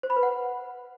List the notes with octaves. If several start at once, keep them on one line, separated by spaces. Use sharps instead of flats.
C5
B5
B4
F#5